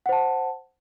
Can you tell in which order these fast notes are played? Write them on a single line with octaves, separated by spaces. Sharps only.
F#5 C5 A5